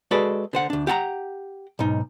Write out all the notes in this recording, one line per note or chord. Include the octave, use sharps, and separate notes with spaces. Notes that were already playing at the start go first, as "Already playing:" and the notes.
G#3 F#4 G#4 A4 B4 D5
D3 C5 F#5
D2 D4
G4 F#5 A5 A#5
B1 G#2 D#4